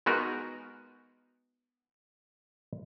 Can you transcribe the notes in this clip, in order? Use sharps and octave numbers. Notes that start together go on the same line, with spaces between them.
G#3 B3 D#4 F#4 A#4